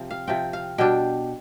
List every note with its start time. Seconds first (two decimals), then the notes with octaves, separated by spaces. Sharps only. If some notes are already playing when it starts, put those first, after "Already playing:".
Already playing: C3 F3 C4
0.11 F5
0.27 C3 F3 C4 G5
0.53 F5
0.78 B2 G3 D4 G5